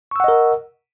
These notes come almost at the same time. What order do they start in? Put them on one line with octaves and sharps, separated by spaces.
C#6 E6 F#5 D#5 A#4